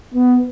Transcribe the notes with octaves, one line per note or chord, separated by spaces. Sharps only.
B3